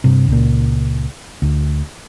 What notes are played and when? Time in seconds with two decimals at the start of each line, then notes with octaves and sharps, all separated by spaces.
0.04 G2 C3
0.28 C#2 A#2
1.42 D2